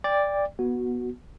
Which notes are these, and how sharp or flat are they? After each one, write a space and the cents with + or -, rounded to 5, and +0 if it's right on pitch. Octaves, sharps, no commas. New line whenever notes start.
D5 +0 G5 +25
B3 -20 F#4 +0